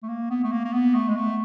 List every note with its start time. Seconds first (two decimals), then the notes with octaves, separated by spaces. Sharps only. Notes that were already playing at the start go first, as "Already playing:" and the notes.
0.03 A3
0.08 A#3
0.30 B3
0.44 A3
0.52 A#3
0.64 A#3
0.73 B3
0.95 A3
1.08 G#3
1.17 A3